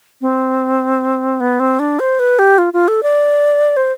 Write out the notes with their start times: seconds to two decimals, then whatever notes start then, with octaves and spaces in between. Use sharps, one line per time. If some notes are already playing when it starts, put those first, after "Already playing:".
0.21 C4
1.40 B3
1.60 C4
1.79 D4
2.00 C5
2.19 B4
2.39 G4
2.58 F4
2.73 F4
2.88 A4
3.03 D5
3.77 C5